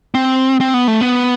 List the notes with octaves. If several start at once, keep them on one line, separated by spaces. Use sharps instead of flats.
C4
C4
B3
A3
B3